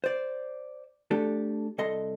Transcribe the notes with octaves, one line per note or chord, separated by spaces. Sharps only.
C5 D5
A3 D4 G4 A4
C2 A4 D#5 C6